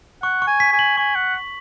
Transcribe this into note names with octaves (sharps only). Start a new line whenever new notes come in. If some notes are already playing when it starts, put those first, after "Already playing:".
F#5 C#6
C#6
G#5
B6
G#5
F#7
G#5 C#6
F#5 C#6
B6